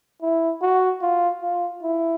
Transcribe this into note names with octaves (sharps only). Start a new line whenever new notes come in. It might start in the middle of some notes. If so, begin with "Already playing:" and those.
E4
F#4
F4
F4
E4